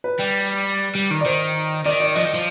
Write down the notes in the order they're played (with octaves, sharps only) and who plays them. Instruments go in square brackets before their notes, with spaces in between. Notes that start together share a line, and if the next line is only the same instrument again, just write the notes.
[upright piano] B4
[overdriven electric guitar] G3
G3
D#3
[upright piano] D5
[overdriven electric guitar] D#3 [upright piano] C5
[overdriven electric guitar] D#3 [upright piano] D5
[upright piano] D5
[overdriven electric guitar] F3 [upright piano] D#5
[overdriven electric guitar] D#3
F3